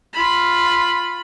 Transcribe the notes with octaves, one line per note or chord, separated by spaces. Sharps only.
F4 B5